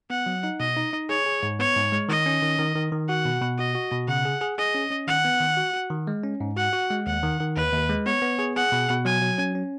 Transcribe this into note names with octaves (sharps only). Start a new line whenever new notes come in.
B3 F#5
F#3
D#4
B2 D#5
D#4
D#4
G#4 C#5
G#4
G#2
B3 C#5
G#2
G#3
D#3 D#5
C#4
D#3
D#3
D#3
D#3
F#4 F#5
B2
B2
F#4 D#5
F#4
B2
C#3 F#5
G#4
G#4
G#4 D#5
C#4
C#4
D#3 F#5
B3
D#3
F#4
F#4
D#3
G#3
C#4
G#2
F#4 F#5
F#4
G#3
D#2 F#5
D#3
D#3
D#2 B4
D#2
G#3
B3 C#5
B3
G#4
G#4 F#5
B2
B2
F#3 G#5
F#3
C#4
C#4